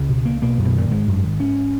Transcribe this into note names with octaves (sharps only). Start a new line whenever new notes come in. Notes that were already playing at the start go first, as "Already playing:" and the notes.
Already playing: C#2 C#3
B2
A#3
B1 B2 A#3
F#2
B2
A#2 D#3
G#1 G#2 G#3
F#2
D#3
C#4